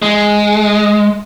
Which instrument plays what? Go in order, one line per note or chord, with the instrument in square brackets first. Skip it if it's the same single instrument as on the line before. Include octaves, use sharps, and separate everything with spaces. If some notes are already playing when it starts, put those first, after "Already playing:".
[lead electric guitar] G#3